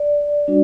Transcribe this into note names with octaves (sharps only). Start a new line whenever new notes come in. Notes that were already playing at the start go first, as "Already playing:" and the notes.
Already playing: D5
G3 D4 F#4